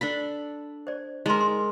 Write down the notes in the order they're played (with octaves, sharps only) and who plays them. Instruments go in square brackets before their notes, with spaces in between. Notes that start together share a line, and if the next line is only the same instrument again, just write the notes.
[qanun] D4 A4 B5
[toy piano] C5 D5
[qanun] G#3 A#4 [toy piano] D#4 A#5 C6
[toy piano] C6